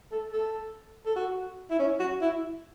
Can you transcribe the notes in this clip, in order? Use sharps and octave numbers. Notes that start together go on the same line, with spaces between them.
A4
A4
A4
F#4
E4
C#4
F#4
E4